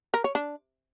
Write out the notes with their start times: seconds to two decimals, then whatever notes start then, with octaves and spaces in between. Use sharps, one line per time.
0.14 A#4
0.24 C#5
0.35 D4